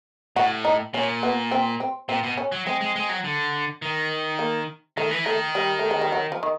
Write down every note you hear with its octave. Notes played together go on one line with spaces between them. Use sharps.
A2 F#4
D#4
A#2 C#4
B3
C4
C4
A#2 C4
B2
C#4
F#3
G#3 C4
G#3
G#3
F#3
D3
D#3
A#3
D#3 A3
E3
D#3 A3
G3
A3
G#3
G3
F#3
F3
D#3